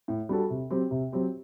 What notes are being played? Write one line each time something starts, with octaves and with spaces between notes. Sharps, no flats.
A2
G3 D4 F#4 A4
C3
F#3 C4 G4
C3
F#3 C4 G4